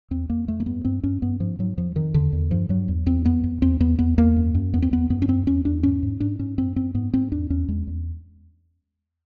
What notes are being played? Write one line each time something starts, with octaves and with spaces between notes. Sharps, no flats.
E2 C4
F2 A#3
F2 A3
A#3
G2 B3
G2 C4
G2 C#4
G2 B3
G#2 F3
G#2 F#3
F2 F3
F2 D#3
E2 D3
E2
G2 F3
G2 F#3
E2
E2 C4
F2 B3
F2
E2 C4
E2 B3
E2 B3
E2 A#3
F#2
F#2
E2 B3
C4
E2 B3
F#2 B3
C#4
F#2 C4
E2 C#4
E2 D4
G#2 C#4
G#2
G#2 D4
G#2 C#4
F#2 C4
F#2 C4
G#2 B3
G#2 C4
E2 D4
E2 C#4
E2 G#3
E2